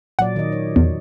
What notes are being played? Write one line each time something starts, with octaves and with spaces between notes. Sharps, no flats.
A#2 F#3 D5 F#5
D#3 D#5
C#5
E2